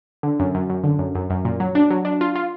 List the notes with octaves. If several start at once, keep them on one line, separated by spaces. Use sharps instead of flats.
D3
F#2
F#2
F#2
D3
F#2
F#2
F#2
A#2
F#3
D4
F#3
D4
F4
F4